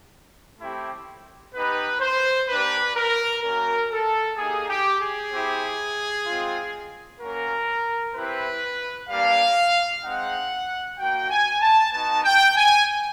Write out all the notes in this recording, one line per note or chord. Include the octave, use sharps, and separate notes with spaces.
A3 C4 E4 G4
B3 D#4 G4 B4
C5
A#3 D4 G4 B4
A#4
A#3 C#4 F#4 A#4
A4
A#3 D#4 G4 G#4
G4
G#4
C4 E4 G4
G#3 C4 F4
A#3 C#4 F#4 A#4
C4 E4 G4 B4
G3 A#3 D4 F5
G#3 C4 D#4 F#5
A#3 D#4 F#4 G5
G#5
A5
B3 D#4 F#4 A5
G5
G#5